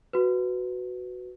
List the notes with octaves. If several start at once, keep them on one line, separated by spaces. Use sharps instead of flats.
F#4 B4